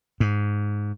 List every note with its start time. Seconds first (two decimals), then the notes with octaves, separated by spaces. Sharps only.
0.20 G#2